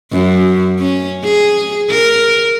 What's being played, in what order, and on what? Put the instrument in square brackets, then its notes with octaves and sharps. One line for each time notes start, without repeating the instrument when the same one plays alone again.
[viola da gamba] F#2
C#4
G#4
A#4